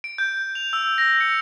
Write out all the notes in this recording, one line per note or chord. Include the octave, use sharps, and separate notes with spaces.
D7
G6
F7
E6
A#6
C#7